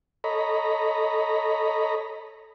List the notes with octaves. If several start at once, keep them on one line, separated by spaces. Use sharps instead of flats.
A4 C#5 D#5 A#5 B5